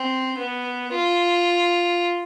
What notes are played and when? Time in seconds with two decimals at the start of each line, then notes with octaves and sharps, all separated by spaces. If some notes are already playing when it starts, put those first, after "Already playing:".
Already playing: C4
0.37 B3
0.91 F4